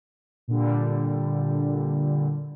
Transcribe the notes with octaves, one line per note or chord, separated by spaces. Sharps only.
A#2 D3 G3